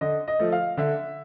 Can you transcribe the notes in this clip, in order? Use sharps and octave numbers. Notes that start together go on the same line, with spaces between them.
D3 D#5
D#5
F3 A3
F5
D3 E5